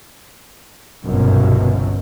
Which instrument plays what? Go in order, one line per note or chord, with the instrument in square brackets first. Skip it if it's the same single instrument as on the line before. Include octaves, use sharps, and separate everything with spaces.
[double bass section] G1 C2 F#2 B2